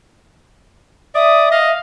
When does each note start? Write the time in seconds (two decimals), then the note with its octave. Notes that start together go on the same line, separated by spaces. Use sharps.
1.15 D5 E5 D#6
1.51 D#5 F5